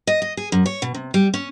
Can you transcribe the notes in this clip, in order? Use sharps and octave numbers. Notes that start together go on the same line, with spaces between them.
D#5
D#5
G#4
F#2
C#5
B2
C3
G3
C#4